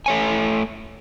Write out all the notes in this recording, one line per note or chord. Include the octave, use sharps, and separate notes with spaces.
A3 C#5 G#5